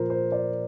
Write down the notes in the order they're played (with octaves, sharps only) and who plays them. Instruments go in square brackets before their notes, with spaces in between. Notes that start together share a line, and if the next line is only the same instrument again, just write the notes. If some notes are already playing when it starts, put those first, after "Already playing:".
Already playing: [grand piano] A#2 F3 A#4 C5
C5
D5